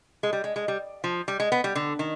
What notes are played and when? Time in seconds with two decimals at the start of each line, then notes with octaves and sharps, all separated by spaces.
0.23 G#3
0.33 G3
0.44 G#3
0.56 G#3
0.68 G3
1.04 F3
1.28 G3
1.40 G#3
1.52 B3
1.64 G3
1.75 D3
1.99 D#3